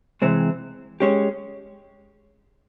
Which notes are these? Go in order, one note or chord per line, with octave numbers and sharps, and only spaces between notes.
C3 E3 G#3 C4
G#3 C#4 G4